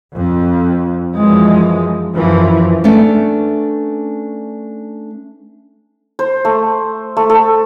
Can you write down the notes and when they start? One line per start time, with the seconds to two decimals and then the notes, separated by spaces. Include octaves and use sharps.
0.15 F2
1.15 F#2 E3 F3 G#3
2.14 F#2 E3 F3
2.84 A3 B3 C#4 D4 A4
6.19 C5
6.45 A3
7.17 A3
7.30 A4